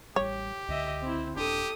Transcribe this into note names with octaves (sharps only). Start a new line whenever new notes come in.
A1 G3 G4 C#5
C#2 D3 D#5 E5
C4 E4
D#1 D4 G4 A4 D#6